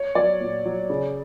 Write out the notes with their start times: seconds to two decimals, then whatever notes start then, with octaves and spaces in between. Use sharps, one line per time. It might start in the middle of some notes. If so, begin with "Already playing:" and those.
Already playing: C#5
0.15 F#3 D5
0.40 A#2
0.65 F#3
0.90 C#3